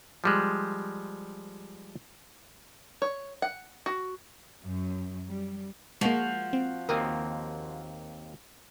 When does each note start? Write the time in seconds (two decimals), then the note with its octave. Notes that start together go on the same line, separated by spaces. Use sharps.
0.24 F3 G3 G#3
3.02 C#5
3.42 F#5
3.86 F#4
4.64 F#2
5.28 G3
6.01 F3 G#3 A#3 F#4
6.53 C4
6.89 D#2 A#3 C4 A#4 D#6